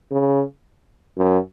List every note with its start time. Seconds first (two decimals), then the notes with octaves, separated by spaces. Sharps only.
0.11 C#3
1.17 F#2